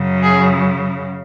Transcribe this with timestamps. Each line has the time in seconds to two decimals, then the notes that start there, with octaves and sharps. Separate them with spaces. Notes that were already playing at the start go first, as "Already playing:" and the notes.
Already playing: F#2 C#3 F#3
0.22 G#4